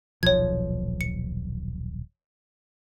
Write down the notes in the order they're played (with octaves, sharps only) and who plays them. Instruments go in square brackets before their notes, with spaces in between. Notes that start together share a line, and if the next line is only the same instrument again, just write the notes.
[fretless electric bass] D#1 B1 F3 [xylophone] C#5 G#6
[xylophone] C#7